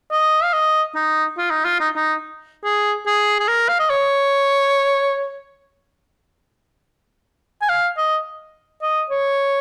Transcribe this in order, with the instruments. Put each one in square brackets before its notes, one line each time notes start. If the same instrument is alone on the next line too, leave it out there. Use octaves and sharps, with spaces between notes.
[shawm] D#5
F5
D#5
D#4
F4
D#4
F4
D#4
D#4
G#4
G#4
G#4
A#4
F5
D#5
C#5
G#5
F5
D#5
D#5
C#5